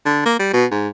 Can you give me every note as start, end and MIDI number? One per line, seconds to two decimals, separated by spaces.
0.06 0.25 50
0.26 0.36 58
0.39 0.49 55
0.54 0.66 47
0.71 0.88 44